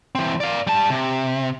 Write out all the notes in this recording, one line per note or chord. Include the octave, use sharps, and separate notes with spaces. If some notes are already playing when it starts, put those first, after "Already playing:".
E3 C4
D5 F5
G3 A5
C3